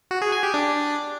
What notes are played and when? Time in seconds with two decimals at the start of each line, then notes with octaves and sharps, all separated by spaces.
0.11 F#4
0.22 G#4
0.32 G#5
0.43 G4
0.54 D4